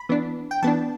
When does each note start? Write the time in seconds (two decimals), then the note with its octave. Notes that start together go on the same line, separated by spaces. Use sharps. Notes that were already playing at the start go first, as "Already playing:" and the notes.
Already playing: B5
0.09 E3 B3 D4
0.51 G5
0.62 E3 B3 D4 A5